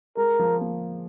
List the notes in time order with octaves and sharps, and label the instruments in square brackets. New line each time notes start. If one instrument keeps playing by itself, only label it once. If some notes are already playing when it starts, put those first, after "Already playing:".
[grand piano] G#3 [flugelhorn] A#4
[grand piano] F3
A#3